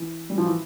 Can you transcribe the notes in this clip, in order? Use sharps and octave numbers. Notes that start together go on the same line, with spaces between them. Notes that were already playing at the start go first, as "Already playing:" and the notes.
Already playing: E3
G3
F3
E3